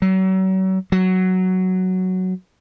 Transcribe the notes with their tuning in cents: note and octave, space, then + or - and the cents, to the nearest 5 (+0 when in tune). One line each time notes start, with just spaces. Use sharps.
F#3 +35
F#3 +5